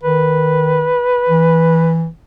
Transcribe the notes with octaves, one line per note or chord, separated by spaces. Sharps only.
D#3 B4
E3